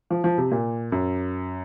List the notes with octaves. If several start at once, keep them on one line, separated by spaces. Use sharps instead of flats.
F3
F3
C3
A#2
F#2